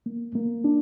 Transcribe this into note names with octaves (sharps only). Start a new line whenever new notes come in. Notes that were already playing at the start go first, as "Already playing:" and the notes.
A#3
A#3
D4